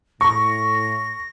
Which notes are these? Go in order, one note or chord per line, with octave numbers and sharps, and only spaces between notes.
A2 C#6 A#6